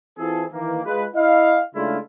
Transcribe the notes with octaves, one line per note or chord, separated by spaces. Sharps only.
E3 C4 E4 F4 G#4 A4
D#3 E3 A#3
G#3 F4 B4
E4 D#5 F5
C#3 G#3 A3 D4 E4 F4